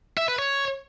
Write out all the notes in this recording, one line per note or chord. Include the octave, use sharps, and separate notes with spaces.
E5
B4
C#5